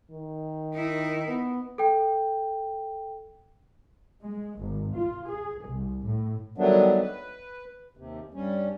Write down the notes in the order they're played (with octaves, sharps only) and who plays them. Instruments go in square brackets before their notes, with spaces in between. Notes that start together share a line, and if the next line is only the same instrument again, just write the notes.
[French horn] D#3
[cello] D#4 E4
[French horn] B3
[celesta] A4 G5
[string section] G#3
G#1
F4
G#4
C2
A2
[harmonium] D#3 F#3 G3 A3 B3 D4
B4
D#2 C3
G2 G3 C#4